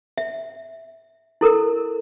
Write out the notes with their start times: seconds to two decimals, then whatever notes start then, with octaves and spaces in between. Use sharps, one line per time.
0.18 E5
1.41 E4 A4 A#4